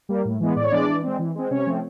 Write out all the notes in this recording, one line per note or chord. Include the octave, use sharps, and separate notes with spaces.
G3 A#3
A2
E3 G#3 B3
A2 D5
C#5
E3 G#3 B3 D4 D5
E3
G#3 C4
E3
G#3 C4
C3 C#4 C#5
F3 A3 C4